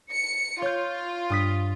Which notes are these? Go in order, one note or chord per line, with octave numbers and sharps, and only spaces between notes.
C#7
F4 C#5 G6
G2 D#6 B6